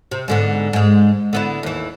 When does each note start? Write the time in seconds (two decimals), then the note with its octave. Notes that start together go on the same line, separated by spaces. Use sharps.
0.11 C3
0.28 G#2 D3 B3
0.73 G#2 G#3
1.33 D3 B3 E4
1.63 D#2 E3